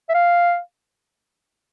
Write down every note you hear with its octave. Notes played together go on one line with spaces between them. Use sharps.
E5
F5